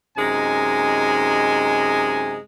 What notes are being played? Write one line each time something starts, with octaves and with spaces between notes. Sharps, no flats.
F#2 C3 G#3 D#4 G#5